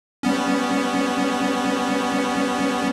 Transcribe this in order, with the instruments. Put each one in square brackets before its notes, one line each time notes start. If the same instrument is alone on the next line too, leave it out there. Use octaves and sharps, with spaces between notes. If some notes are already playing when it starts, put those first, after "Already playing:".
[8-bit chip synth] G3 B3 C#4